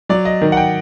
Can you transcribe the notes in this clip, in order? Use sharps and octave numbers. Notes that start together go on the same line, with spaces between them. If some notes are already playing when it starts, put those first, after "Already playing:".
F#3 D5
D#5
D#3
F#5
G5